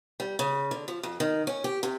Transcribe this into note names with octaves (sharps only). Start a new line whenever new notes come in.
G3
C#3
D3
F3
F2
D#3
C#4
G4
C3